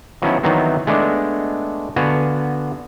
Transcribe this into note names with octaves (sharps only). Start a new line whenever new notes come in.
D#3 F3 F#3 B3 C#4 E4
D#3 E3 F#3 B3 C4
G#3 A3 B3 D4
D3 B3 F#4 F5 G#5 A5